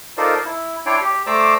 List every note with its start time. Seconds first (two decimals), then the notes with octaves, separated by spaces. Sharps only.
0.18 D#4 F4 A4 A#4 C5 D5
0.46 E4
0.86 D4 E4 C#5 D5 G5 C6
1.01 G4
1.27 A3 C5 D5 A#5 D6 E6